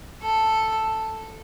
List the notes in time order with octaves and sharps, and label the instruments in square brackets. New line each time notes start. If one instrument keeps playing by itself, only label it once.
[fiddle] A4